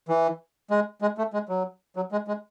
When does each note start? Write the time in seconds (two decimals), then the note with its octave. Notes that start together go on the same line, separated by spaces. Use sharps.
0.09 E3
0.71 G#3
1.02 G#3
1.18 A3
1.33 G#3
1.49 F#3
1.96 F#3
2.12 G#3
2.28 G#3